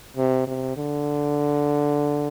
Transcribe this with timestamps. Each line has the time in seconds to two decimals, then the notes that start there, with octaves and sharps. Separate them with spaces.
0.17 C3
0.47 C3
0.77 D3